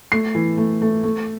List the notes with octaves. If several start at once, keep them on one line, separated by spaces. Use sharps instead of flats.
A3 C7
E3
A3
A3
A3